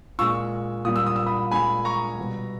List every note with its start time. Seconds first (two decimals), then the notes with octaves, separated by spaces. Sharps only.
0.19 A#2 G#3 C#6 E6
0.85 A#2 G3 D#6
0.96 E6
1.06 D#6
1.16 E6
1.26 B5 D#6
1.51 A#2 G#3 G#5 B5
1.85 A#5 C#6
2.19 B2 G3